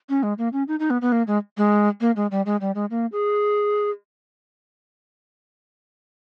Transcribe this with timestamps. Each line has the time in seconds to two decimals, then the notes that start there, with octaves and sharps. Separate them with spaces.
0.09 C#4
0.23 G#3
0.38 A#3
0.53 C#4
0.68 D#4
0.79 D#4
0.90 B3
1.01 B3
1.12 A#3
1.27 G#3
1.57 G#3
2.01 A#3
2.16 G#3
2.31 G3
2.46 G#3
2.61 G3
2.75 G#3
2.91 A#3
3.12 G#4